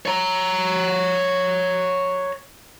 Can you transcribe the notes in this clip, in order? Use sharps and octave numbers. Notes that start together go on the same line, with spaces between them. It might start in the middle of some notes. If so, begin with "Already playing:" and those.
C#5 A#5